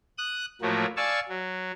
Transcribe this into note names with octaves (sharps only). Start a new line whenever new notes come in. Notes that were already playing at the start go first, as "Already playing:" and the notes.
D#6 F#6
A2 F3 F#3 A3 A#3
D5 F5 G#5 A5 C#6 E6
F#3